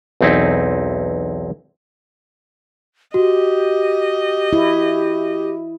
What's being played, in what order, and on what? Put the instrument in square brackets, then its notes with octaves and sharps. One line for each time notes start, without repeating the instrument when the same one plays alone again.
[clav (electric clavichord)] B1 E2 C4 D#4 E4
[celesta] F#4 [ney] G4 [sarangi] D#5
[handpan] E4